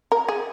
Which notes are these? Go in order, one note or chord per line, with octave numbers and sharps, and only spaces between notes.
A#4
G#4